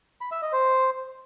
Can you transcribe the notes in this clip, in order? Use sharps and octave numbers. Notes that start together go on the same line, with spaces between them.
B5
E5
D#5
C5